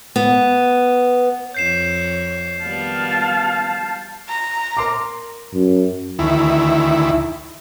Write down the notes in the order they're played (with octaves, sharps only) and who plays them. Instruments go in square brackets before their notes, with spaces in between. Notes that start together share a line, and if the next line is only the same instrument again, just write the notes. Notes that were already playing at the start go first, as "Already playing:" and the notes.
[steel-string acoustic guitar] B3
[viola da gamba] F2 C#5 [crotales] G6 C7 E7
[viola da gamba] D#3 G3 B3 [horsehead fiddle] F5 A5
[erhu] A#5
[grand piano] A#4 C6 D6
[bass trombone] F#2
[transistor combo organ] D2 D#3 E3 E4